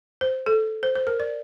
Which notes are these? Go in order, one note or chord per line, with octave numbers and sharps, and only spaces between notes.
C5
A4
C5
C5
A#4
D5